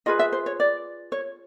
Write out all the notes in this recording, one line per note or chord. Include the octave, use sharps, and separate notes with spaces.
F4 G#4 B4 D#5
E5
C5
C#5
D5
C#5